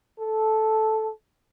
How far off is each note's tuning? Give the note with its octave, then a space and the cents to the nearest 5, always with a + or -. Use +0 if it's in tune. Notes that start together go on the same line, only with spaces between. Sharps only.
A4 -10